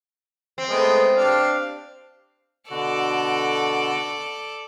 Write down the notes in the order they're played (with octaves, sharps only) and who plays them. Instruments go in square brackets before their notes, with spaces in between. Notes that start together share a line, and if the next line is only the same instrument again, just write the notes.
[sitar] C4
[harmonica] G#3 A3 B3
D4 G4 F5
[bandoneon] B2 D3 F#4 [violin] A4 D5